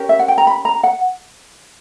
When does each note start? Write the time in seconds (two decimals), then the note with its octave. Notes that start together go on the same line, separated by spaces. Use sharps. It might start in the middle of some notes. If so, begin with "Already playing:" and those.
Already playing: C#4 G4 A#4
0.09 E5
0.19 F#5
0.28 G5
0.38 A#5
0.47 B5
0.65 A#5
0.83 F#5